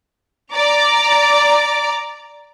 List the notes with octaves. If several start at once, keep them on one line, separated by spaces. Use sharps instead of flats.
D5 A#5 D6